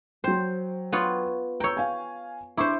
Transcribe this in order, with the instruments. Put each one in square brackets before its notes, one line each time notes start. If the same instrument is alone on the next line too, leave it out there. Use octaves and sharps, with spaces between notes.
[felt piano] F#3 G5 [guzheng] C5
[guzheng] B3 F4 C#5
[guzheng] C#5 G5 [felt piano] A#5 E6
[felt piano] F5 G#5
[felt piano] D4 C#6 D6 [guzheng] E4 C5